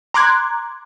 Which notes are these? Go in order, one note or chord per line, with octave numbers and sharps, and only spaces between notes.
A#5 C6 D6 F#6 G#6